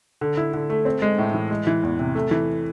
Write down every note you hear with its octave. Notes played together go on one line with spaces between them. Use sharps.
D3
E4
D3
A3
C4
G#3
A2
E3
G#3
E3
E2
C3
A3
E3